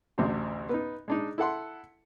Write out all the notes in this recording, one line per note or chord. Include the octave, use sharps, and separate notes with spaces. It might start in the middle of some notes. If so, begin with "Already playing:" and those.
A1 D2 C3 C4 D4 F#4
B3 D#4
G#3 D4 D#4
E4 A4 F#5 C6